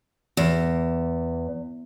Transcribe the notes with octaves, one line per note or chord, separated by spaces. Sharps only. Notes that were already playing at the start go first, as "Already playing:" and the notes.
E2